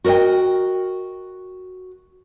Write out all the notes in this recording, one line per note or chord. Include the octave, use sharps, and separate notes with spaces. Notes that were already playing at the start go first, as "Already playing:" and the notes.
F#4 A#4 C#5 D#5 G5